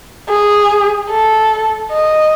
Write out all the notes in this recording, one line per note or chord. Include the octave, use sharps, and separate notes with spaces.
G#4
A4
D#5